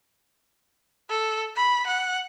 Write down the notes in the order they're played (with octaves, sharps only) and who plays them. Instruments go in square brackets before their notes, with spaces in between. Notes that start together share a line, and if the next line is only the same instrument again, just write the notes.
[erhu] A4
B5
F#5